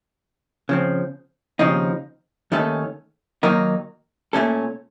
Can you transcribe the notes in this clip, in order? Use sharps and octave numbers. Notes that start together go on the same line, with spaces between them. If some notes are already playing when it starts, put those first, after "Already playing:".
C#3 F3 C4
D#2 C#3 F3 C4 D#4
D#2 D#3 A3 C#4 A4
D#3 F#3 A#3 D#4 A#4
A#2 A3 C#4 A4